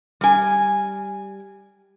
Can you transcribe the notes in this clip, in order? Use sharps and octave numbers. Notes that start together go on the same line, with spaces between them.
G3 G#5